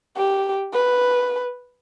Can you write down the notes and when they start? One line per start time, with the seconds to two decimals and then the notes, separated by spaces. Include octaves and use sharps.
0.16 G4
0.73 B4